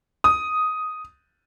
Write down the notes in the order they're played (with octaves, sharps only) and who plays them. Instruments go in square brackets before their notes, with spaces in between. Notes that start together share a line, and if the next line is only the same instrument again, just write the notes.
[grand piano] D#6